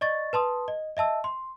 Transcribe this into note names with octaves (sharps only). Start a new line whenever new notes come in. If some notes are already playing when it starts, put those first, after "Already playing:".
D5 D#5 C#6 A6
B4 A5 C6 D#6
D#5
D#5 E5 A5 E6
C6